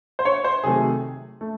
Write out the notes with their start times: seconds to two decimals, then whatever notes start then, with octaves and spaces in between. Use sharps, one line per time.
0.19 C5
0.25 C#5
0.44 C5
0.63 C3 D#3 F#3 A3 G#4
1.41 A3